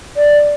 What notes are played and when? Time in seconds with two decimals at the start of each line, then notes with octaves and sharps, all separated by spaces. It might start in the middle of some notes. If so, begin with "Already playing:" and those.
0.17 D5